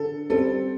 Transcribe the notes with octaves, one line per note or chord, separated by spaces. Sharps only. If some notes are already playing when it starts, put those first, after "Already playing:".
Already playing: D3 A4
G3 C4 A4